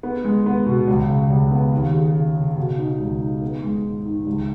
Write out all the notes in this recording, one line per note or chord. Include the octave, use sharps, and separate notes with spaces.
B3
G#3
B3
B2
C#2
C#3
C#2
B3
D#2
G#4
C#3
C#3
B2
D#4
C#2
D#4
B3
G#3
G#2
D#3
C#2